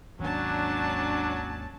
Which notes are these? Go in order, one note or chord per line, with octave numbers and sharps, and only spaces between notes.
G#1 D#2 F#3 C#4 D4 A5